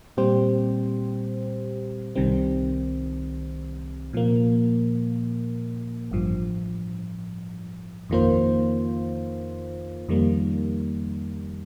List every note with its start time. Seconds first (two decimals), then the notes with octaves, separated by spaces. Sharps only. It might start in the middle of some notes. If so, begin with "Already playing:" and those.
0.17 A#2 G3 C4 G4 C5
2.15 C2 C3 D#3 G3 C4
4.13 A#2 F3 A#3
6.11 A1 G2 F3
8.09 F2 D#3 A#3 F4 C5
10.08 F2 D#3 G3 A#3